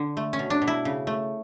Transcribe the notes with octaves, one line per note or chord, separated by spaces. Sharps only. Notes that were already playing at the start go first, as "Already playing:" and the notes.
Already playing: D3
A3
C#4
B2
D4
B2
E4
C#3
A3